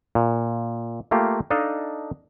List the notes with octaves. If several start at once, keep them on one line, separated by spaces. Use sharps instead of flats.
A#2
A3 A#3 F4 G4
D4 D#4 A4 D#5 F5